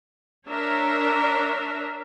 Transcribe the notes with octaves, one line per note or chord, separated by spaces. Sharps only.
D4 A#4 C#5 E5